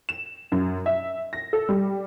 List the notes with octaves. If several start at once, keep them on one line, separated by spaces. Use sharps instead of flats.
E7
F#2
E5
A#6
A4
G3